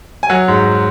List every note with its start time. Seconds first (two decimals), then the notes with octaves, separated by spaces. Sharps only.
0.23 G#5
0.30 F#3 F#5
0.48 G#2
0.65 G#2